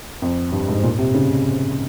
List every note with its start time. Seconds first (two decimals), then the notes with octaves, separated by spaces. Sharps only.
0.22 F2
0.52 G2
0.68 G#2
0.83 A#2
0.98 C3
1.14 C#3